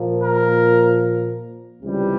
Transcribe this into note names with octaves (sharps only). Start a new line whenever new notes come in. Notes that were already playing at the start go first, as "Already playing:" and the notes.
Already playing: A#2 F3 A#3
A#4
C#2 C3 E3 G3